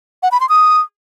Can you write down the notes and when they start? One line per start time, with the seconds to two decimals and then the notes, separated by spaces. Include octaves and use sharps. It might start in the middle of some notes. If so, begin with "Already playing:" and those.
0.23 F#5
0.32 B5
0.40 C6
0.49 D#6